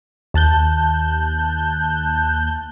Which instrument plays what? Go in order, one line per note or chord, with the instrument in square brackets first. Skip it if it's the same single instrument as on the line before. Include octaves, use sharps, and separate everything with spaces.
[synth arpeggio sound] D#2 A5 F#6 G6